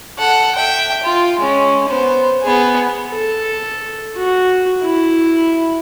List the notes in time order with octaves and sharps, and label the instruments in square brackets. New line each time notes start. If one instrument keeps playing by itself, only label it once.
[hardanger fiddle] A4 F#5
E5 G5
F4
G#3 C#4
B3 C5
B3 G#4
[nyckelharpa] A4
F#4
E4